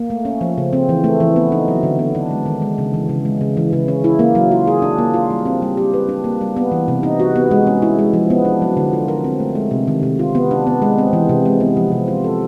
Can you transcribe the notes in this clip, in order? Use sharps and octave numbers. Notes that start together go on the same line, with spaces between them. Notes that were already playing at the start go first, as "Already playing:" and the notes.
Already playing: A#3
A3
C#4
F3
C#3
C4
E3
A3
E3
B3
D#4
F#3
D3
B3
D4
G#3
D#3
G#3
C#3
E3
C#3
G#3
C#3
E3
C#3
C#4
E4
A#3
F#3
F4
G#4
D4
A#3
F4
G3
C4
G3
G4
B4
D4
A#3
G3
B3
E3
C3
D#4
F#4
B3
G#3
C#4
E4
G#3
F3
B3
D4
F#3
D3
F4
A#4
C4
A3
G#3
C3
D#3
C3
F4
B3
D4
B3
G#3
C4
E3
C3
G#3
B3
F3
C3
F4
A4